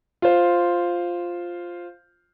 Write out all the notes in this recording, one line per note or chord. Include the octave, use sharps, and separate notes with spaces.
F4 C5